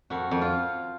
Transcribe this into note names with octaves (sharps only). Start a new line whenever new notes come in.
F2 F#4
F2
F4